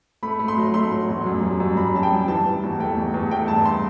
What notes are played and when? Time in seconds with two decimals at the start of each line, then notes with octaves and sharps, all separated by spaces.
0.23 A3 B5
0.39 A3
0.48 C6
0.58 F#3
0.74 A3 C6
0.91 F#3
1.09 E2
1.26 F#2
1.43 G3
1.60 F#2
1.77 F#2 B5
1.95 G3 A5
2.03 G5
2.12 G3
2.28 E3 A5
2.46 E3
2.63 E2
2.80 A3 G5
2.96 E2
3.14 E2
3.31 A3 G5
3.48 G2 A5
3.65 C6